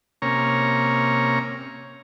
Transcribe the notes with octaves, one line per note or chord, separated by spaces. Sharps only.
C3 A#3 C#4 C#5 A#5